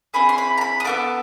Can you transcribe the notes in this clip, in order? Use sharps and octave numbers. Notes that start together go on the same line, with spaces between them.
C4 E4 G#4 B5
C6
B5
A#5
B5
D#6
B3 E4 A4 D6